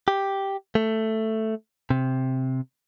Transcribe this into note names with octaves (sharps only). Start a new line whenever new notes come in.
G4
A3
C3